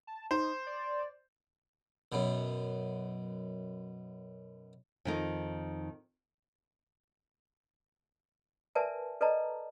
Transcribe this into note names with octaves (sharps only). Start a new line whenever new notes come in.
A5
D#4 C5
D5
F#2 B2
F2 D#3 D#4
A#4 B4 D5 E5 G#5 A5
A4 B4 D5 D#5 A5 A#5